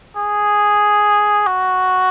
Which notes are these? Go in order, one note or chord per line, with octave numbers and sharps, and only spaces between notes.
G#4
F#4